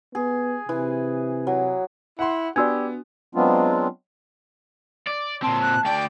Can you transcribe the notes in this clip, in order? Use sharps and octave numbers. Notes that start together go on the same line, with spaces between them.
B3 G#4
C3 E3
F#3
E4 F#5 C6
B3 D4 F#4 G4 D5 E6 G#6
F#3 G#3 B3 C4 D4 F4
D5
A#2 C4 A5 C6
F#6
D2 D5 G5